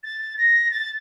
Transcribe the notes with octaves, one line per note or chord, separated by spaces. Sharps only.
A6
A#6
A6